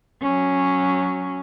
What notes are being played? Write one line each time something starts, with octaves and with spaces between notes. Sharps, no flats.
F#3 C#4